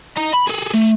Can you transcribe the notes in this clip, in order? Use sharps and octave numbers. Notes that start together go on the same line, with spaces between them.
D#5 A#5
B5
G#4 A4
A3